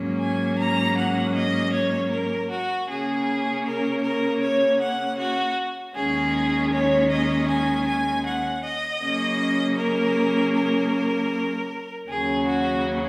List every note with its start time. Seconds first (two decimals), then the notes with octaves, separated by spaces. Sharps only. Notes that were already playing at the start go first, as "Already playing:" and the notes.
Already playing: G#2 F#3 A#3 C#4
0.20 G#5
0.59 A#5
0.97 F#5
1.36 D#5
1.73 C#5
2.11 A#4
2.50 F#4
2.89 C#3 A#3 C#4 G#4
3.65 A#4
4.03 A#4
4.41 C#5
4.80 F#5
5.19 F#4
5.94 D#2 D#3 G#3 C#4 G#4
6.72 C#5
7.10 D#5
7.48 G#5
7.87 G#5
8.26 F#5
8.63 D#5
9.02 C#3 F#3 A#3 C#4
9.78 A#4
10.54 A#4
12.08 D#2 C#3 F#3 C#4 G#4
12.46 F#4